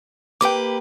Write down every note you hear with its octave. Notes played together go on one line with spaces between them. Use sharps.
A#3 G4 B4 G5 D6